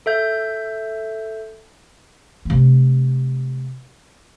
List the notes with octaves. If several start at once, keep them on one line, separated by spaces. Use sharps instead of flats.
A4 E5 G6
C3 A3